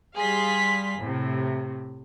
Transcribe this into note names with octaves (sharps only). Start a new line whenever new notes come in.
G3 G#4 F5 C6 B6
A2 C3